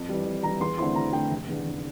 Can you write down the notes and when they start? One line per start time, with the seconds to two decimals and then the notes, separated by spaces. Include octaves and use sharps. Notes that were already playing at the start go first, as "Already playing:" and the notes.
Already playing: F2
0.09 E3 G3
0.26 F2
0.43 E3 G3 A#5
0.60 E2 C6
0.78 D3 A3 C4 E4 C6
0.95 E2 A#5
1.13 D3 A3 C4 E4 G5
1.30 F1
1.48 E2 D3
1.65 F1